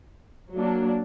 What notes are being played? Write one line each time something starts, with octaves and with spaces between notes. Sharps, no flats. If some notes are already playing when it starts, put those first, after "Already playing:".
F#3 A#3 D4